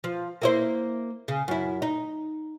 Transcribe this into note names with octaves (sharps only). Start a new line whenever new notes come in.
F3
A#3 E4 C5
C#3
F#2 E4
D#4